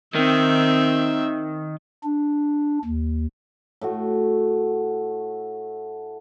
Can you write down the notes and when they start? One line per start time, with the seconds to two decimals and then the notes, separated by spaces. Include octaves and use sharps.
0.15 D#3 C4 E5
2.03 D4
2.85 D#2
3.81 A2 A3 F#4